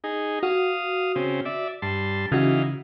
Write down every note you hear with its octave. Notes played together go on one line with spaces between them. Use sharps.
D#4 G#4
F#4 F5 D#6
C#3 C4
D5 E5
G2 A5 C6
C#3 E3 D#4 F#4 F5